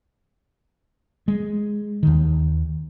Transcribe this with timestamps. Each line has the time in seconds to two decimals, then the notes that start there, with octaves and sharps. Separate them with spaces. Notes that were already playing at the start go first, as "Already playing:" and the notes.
1.28 G#3
2.03 D#2 D#3